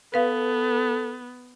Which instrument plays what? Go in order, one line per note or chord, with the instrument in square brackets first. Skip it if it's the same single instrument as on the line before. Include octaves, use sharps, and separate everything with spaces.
[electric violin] B3 [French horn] A4 [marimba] B4 F5